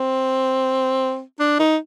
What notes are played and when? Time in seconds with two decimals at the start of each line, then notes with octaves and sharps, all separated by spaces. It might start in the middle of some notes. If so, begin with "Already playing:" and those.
Already playing: C4
1.39 D4
1.59 D#4